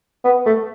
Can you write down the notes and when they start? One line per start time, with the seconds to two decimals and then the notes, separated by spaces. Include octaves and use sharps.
0.25 B3
0.46 A3